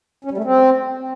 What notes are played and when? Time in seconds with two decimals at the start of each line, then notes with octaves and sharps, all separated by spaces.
0.25 C#4
0.31 G3
0.38 A3
0.44 C4